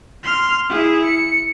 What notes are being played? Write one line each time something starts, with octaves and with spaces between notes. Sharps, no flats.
C6 F6
E4 G#4
C#7